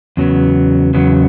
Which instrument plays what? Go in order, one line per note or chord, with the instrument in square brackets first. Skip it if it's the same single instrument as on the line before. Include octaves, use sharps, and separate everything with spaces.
[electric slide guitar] E2 C#3 F#3 B3
E2 C#3 F#3 B3